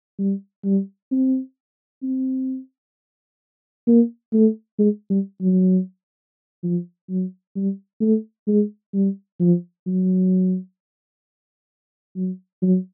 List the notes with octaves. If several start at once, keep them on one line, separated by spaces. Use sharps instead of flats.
G3
G3
C4
C4
A#3
A3
G#3
G3
F#3
F3
F#3
G3
A3
G#3
G3
F3
F#3
F#3
F#3